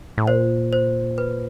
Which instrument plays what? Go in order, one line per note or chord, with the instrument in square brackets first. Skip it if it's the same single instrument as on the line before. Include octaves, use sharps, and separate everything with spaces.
[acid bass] A2
[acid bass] A#2 [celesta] C5
[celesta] C5
B4